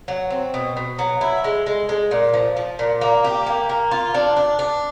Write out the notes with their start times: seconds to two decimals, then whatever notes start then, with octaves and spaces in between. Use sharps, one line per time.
0.08 F#3
0.30 C4
0.54 B2
0.77 B2
0.99 F#3
1.21 E4
1.44 G#3
1.66 G#3
1.89 G#3
2.11 A#2
2.34 F3
2.56 F3
2.79 A#2
3.01 A#3
3.24 G4
3.46 A#3
3.69 A#3
3.91 F4
4.14 D4
4.37 D4
4.59 D4